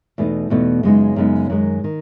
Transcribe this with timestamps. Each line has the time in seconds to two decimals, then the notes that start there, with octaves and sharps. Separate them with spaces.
0.18 E2 B2 A3 D#4
0.50 E2 B2 A3 D#4
0.83 F#2 C#3 G#3 B3 D#4
1.16 F#2 C#3 G#3 B3 D#4
1.50 F#2 D#3 G#3
1.84 D#3